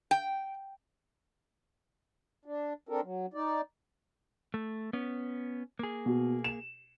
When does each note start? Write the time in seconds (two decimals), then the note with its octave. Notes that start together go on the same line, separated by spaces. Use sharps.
0.11 G5
2.46 D4
2.89 C4 D4 A4 A#4
3.03 F#3
3.34 D#4 D5
4.54 A3
4.93 B3 C#4
5.79 A#3 G#4
6.06 B2
6.44 E7